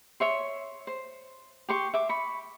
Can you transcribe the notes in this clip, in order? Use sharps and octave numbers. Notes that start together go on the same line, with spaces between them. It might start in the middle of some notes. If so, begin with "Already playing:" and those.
C#5 E5 C6
C5
G4 C6 C#6
E5 D6
B5 C#6